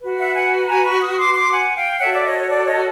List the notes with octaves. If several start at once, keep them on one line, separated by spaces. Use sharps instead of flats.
F#4 B4
E5 F#5
F#5 G#5
B5
G#5 A#5
B5 C#6
C#6 D#6
C6 D6
C6 D6
F#5 G#5
F5 G5
F#4 A4 C#5 E5 F#5
D5 E5
C#5 D#5
C#5
D5
C#5 D#5